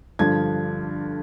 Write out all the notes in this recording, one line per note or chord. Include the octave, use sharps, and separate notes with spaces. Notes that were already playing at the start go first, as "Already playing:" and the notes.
G2 D3 F3 G#6